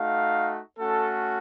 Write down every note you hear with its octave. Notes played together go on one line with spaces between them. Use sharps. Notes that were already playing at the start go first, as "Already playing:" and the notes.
Already playing: A3 D#4 F#4 F5
A3 C#4 F#4 A4